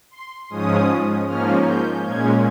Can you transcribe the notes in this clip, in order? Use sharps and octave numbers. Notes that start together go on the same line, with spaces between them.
C6
G#2 F3 G#3 C#4 D#6
G#2 F3 A#3 C#4 F6
G6
A#2 G#3 C#4 G#6